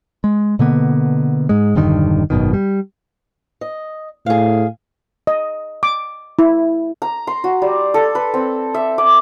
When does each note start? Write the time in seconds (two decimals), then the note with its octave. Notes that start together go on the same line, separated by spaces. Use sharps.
0.24 G#3
0.59 B2 D3 A#3 B3
1.49 G#2 G#3
1.75 E1 G2 D3 D#3
2.30 G#1 F#2 B2 D#3
2.53 G3
3.61 D#5
4.26 A2 G#4 F5
5.27 D#5
5.83 D6
6.39 E4
7.02 A#5
7.27 C6
7.44 F#4
7.62 G3
7.94 A4
8.15 B4
8.34 C4
8.74 E5
8.98 D6